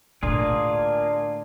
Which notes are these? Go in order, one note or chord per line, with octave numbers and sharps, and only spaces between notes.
A2 D3 A#3 D4 F4 G#4